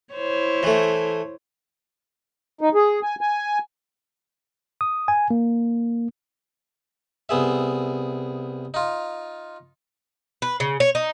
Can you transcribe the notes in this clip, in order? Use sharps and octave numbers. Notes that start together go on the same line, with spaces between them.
E4 C5 C#5
E3 A3
D#4
G#4
G#5
G#5
D#6
G#5
A#3
C2 B3 G#4 E5
D#4 F4
B4
C#3
C#5
D#4